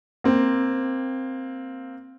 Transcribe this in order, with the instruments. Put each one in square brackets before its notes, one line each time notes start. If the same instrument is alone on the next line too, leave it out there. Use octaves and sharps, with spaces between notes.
[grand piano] A#3 C4